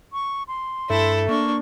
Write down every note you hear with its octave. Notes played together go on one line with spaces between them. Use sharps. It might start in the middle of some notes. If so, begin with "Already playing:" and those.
C#6
C6
G2 A3 E4 A4
A#3 D4 C#6